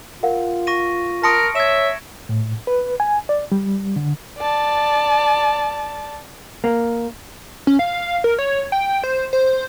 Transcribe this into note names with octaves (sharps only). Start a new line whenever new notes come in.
F4 A#4 F5 F#5
C#6 A#6 D#7
A#4 A5 C6 D#6 A#6 C#7 D7
C#5 E5 G#6 E7
A2
B4
G#5
D5
G3
D3
D5 A5
A#3
C#4
F5
A#4
C#5
G5
C5
C5